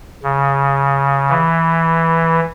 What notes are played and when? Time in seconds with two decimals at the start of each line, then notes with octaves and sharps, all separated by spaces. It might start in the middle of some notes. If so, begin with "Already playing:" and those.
0.23 C#3
1.30 E3